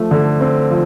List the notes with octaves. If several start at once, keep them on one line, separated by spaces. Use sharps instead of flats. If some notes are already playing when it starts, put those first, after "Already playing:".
Already playing: F3 A3
D3
C4
F3